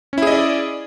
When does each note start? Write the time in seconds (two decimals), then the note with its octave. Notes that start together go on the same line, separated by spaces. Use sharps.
0.13 C#4
0.18 E4
0.22 G#4
0.27 D#5
0.32 D5